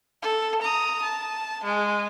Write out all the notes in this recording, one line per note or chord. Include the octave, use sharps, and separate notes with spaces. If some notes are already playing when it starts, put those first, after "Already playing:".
A4
A#5 D#6
A5
G#3